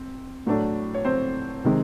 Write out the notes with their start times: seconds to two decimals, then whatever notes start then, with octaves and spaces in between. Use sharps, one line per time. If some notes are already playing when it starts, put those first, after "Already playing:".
Already playing: C4
0.47 A2 F#3 A3 D4
0.94 C#5
1.05 C4 C5
1.64 C3 D#3 G#3 C4